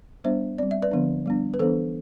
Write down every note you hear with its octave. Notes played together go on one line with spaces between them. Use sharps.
G3 B3 D4 C5 E5
G3 C4 D5
E5
B4 D5
D3 F3 B3 D4
G3 B3 D4
B4
E3 B3 D4 A4 C5